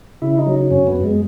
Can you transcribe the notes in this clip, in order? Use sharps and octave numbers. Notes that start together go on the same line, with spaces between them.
C#3 E4
D#4
F#3
F#2 C#4
B3
F#2
G#3